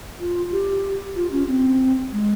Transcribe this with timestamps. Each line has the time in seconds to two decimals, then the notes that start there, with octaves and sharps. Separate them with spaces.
0.20 F4
0.51 G4
1.16 F4
1.32 C#4
1.48 C4
2.12 G#3